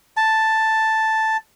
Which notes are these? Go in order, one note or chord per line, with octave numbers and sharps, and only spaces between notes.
A5